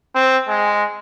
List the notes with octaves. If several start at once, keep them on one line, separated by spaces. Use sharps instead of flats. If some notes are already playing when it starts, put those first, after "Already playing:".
C4
G#3